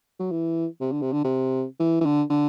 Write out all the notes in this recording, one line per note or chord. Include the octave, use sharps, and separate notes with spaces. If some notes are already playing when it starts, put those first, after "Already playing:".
F#3
E3
C3
D3
C3
D3
C3
E3
E3
D3
D3